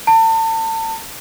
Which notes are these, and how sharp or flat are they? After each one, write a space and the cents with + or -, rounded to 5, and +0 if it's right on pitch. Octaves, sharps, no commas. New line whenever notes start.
A5 +35